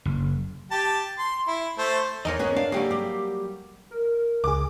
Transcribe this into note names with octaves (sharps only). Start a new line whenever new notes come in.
F#1
G4 A5
C6
E4
A3 C5
E2 D#4 A#4 C#5 D#5
B3 C#4 G#4
D4 F5
F#3 G3 A#3 G4 G#4
G4
A#4
C#2 G#4 D6